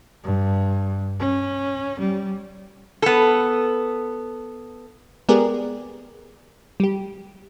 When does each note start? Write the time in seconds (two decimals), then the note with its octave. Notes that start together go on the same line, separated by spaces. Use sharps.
0.24 G2
1.19 C#4
1.99 G3
3.02 B3 A4
5.29 G#3 B3 G4 G#4 A#4 D5
6.80 G3 G4